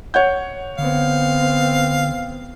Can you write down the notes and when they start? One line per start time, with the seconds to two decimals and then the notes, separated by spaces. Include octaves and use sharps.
0.14 C#5 F#5 G6
0.78 D3 B3 C4 F5